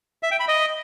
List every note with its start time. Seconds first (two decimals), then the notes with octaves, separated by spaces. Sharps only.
0.23 E5
0.31 G5
0.40 B5
0.48 D#5